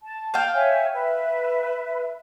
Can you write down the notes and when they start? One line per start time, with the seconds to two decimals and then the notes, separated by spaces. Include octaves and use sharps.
0.03 A5
0.34 F5 G5
0.54 C#5 E5 G#5
0.93 B4 E5